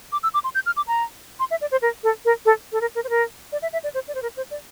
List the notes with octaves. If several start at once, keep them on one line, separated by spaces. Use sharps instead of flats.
D6
E6
D6
C6
G6
F6
D6
A#5
C6
E5
D5
C5
A#4
A4
A#4
A4
A4
A#4
A#4
C5
A#4
D5
E5
E5
D5
C5
D5
C5
A#4
C5
D5